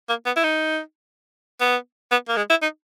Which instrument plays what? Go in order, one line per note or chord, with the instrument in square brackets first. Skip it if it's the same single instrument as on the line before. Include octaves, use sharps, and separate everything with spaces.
[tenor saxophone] A#3
B3
E4
D#4
B3
B3
A#3
G#3
E4
D#4